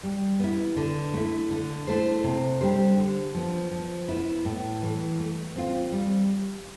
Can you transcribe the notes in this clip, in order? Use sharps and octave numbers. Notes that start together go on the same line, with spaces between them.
G3
B3 E4
D3
A3 E4
D3
A3 E4 A4 C5
C3
G3 D4 G4 C5
D3
F3 B3
F3
B3 E4
A2
E3 A3
A3
C4 F4
G3